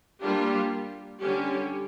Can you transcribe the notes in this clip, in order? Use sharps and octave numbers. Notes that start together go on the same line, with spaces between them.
G3 A#3 D4 F4 G4
D3 G3 C#4 G4